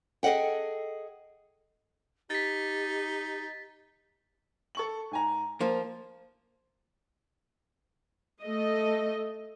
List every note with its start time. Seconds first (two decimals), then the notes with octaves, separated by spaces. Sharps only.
0.23 G#4 A4 D#5 F#5 G5
2.30 D#4 G4 A6 B6
4.75 A4 C#6 F#7
5.11 G#2 G#5 A#5
5.61 F3 A#3 A#4
8.43 A3 A4 D#5